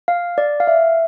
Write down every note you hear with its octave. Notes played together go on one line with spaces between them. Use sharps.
F5
D5
F5
E5